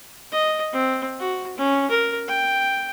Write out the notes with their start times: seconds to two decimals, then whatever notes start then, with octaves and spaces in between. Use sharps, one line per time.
0.32 D#5
0.73 C4
1.19 F#4
1.57 C#4
1.90 A#4
2.28 G5